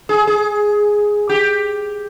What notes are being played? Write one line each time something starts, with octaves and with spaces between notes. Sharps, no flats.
G#4
G#4
G4